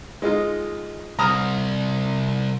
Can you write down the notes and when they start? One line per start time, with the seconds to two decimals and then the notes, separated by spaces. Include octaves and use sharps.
0.22 G#3 D#4 F4
1.19 C2 A#5 D#6 F6